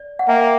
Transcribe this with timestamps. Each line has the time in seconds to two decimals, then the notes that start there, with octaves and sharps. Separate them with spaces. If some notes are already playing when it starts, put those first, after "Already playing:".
Already playing: D5
0.19 F#5
0.28 A#3 E5 G5